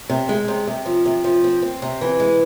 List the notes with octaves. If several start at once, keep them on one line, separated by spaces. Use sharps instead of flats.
C3
G#3
C3
C3
F3
C3
F3
C4
C4
C3
E3
G#3